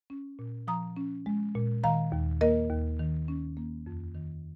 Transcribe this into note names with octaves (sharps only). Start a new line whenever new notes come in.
C#4
A#2
F3 A#5 D#6
C#4
G#3
A#2
D#3 F5 A#5
D#2
A#3 A#4 D#5
D#2
D#3
C#4
A#3
F2
D#3